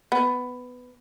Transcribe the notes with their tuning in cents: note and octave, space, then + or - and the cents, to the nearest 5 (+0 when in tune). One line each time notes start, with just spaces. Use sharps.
B3 +10